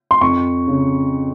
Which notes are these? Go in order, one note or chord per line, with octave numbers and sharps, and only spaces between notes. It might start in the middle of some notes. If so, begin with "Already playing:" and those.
C6
F2 C#6
C#3